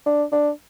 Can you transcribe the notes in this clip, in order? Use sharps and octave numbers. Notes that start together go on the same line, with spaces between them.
D4
D4